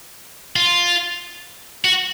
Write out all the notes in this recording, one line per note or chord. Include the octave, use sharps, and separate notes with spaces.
F4
F#4